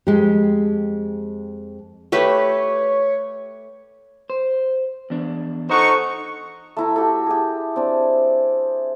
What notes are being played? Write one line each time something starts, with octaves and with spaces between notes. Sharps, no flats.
F2 G#3 G4
A3 G4 B4 C#5
C5
E2 D4
D#4 A4 C5 F#5 C#6
A3 E4 A#5
F#4 G4 A4
G4 G#4
C4 D4